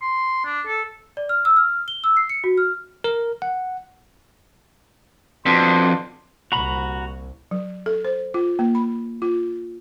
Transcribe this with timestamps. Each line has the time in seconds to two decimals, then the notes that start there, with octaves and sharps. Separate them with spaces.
0.02 C6
0.45 D4
0.66 A4
1.17 D5
1.29 F6
1.45 E6
1.57 F6
1.88 G7
2.04 E6
2.17 C7
2.29 C#7
2.44 F#4
2.58 F6
3.04 A#4
3.42 F#5
5.46 F2 B2 D4 C6
6.52 C2 A#2 F#4 A#5 B5
7.51 F#3
7.86 A4
8.05 C5
8.34 F4
8.59 A#3
8.75 B5
9.22 F4